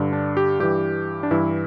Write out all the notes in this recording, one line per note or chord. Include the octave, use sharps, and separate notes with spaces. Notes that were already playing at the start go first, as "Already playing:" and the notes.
Already playing: G2 D3
D4
G4
G2 E3 G4
D4
G2 E3 E4